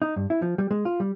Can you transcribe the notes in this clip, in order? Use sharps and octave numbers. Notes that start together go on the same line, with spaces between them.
D#4
G2
E4
F3
G3
G#3
F4
G3